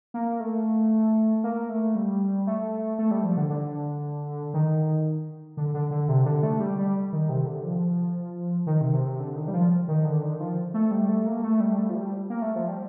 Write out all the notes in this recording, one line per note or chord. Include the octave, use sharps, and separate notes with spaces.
A#3
A3
A#3
A3
G3
A3
A3
G3
F3
D3
D3
D#3
D3
D3
D3
C3
D3
A3
G3
G3
D#3
C3
D3
F3
D#3
C3
C3
C3
D3
D#3
G3
F3
D#3
D3
D#3
F3
A3
G3
A3
A#3
A3
G3
A3
F3
G3
A#3
A3
F3
G3